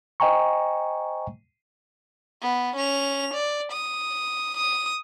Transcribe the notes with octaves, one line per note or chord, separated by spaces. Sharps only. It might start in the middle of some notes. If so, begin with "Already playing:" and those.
C5 D#5 G5 G#5 A#5 C#6
B3
C#4 F7
D5
D#6
D#6